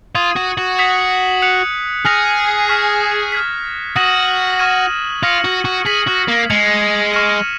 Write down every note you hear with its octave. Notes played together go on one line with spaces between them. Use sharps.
F4 D#6 G#6 D#7
F#4
F#4
D#6 G#6 B6 F7
F#6 C#7 F7
G#4 F6 A#6 F7
C#6 F6 B6
F6 G#6 B6
F#4 D#6 A#6 D#7 F#7
C#6 F6 G#6 D#7
F4 F6 A#6 C#7 F#7
F#4
F#4
G#4 G#6 B6 F#7
F#4
A#3
G#3 G#6 C#7 F7
C#6 F6 A#6 D#7